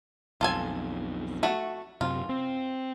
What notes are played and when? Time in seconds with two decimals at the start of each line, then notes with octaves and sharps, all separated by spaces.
0.41 B1 F2 F4 A4 G#5
1.43 A3 F#4
2.01 F#2 C3 C4 F4
2.29 C4